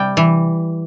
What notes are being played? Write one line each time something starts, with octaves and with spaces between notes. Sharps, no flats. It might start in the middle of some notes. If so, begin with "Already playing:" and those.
Already playing: C3 G3 G5
E3